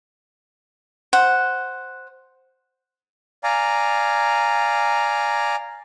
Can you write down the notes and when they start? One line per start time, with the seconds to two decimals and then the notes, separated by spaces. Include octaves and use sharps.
1.13 C5 F#5
3.44 D5 F5 G#5 A#5